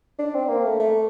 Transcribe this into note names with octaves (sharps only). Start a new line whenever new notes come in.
D4
C4
A#3
A3
A3